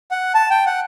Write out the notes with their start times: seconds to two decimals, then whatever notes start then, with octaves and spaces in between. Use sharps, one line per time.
0.11 F#5
0.35 A5
0.50 G5
0.66 F#5